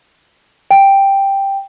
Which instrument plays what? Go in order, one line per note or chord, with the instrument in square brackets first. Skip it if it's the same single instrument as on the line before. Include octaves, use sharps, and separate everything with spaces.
[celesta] G5